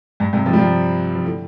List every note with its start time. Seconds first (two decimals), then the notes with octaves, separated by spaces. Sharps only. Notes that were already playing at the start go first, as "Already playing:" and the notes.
0.20 G2
0.33 G2 C3
0.46 C3 F3
0.53 G3
0.59 C3 F3
1.15 F3
1.25 A2 D3